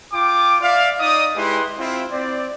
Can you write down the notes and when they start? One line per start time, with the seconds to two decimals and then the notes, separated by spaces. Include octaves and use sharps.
0.13 F4 G5 D6
0.62 D5 E5 F5
0.99 D#4 D5 D#5 D#6
1.36 G#3 E4 G4 B4 C6
1.79 C4 E4 F4
2.11 C4 D5